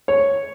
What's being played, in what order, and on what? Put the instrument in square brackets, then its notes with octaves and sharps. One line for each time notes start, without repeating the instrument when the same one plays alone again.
[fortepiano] C#5